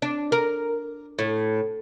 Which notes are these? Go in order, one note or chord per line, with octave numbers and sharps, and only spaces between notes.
D4
A#4
A2